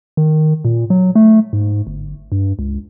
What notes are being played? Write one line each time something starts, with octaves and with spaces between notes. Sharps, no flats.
D#3
A#2
F#3
A3
G#2
G1
G2
C#2